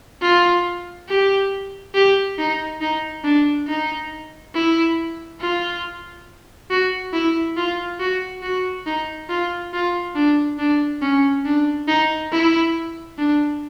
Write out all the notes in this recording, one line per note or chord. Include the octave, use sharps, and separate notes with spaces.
F4
G4
G4
D#4
D#4
D4
D#4
E4
F4
F#4
E4
F4
F#4
F#4
D#4
F4
F4
D4
D4
C#4
D4
D#4
E4
D4